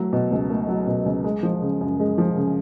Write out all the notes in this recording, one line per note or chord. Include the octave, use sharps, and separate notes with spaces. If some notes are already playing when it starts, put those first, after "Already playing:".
Already playing: F#3 A3
B2
C#2
A3
F#3
B2
C#2
G#3
F3
C#3
F#2
G#3
F3
C#3